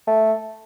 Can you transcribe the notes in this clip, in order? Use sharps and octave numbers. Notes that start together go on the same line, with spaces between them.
A3